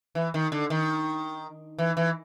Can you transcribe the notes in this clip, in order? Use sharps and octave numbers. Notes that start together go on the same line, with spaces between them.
E3
D#3
D3
D#3
E3
E3